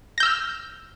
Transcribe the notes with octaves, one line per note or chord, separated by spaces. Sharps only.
E6 F6 G6 A#6